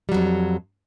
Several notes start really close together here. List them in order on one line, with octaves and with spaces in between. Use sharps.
G3 F#3 F2